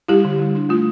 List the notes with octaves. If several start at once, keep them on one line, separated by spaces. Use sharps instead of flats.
G3 E4 G4
D3
G3
D4
A3 F4